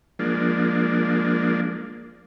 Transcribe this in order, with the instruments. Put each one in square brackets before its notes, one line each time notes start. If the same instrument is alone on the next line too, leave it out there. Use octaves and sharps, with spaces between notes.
[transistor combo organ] F3 G#3 A#3 D4